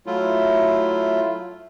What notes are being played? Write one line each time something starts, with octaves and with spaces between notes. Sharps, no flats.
F#3 A3 E4 F4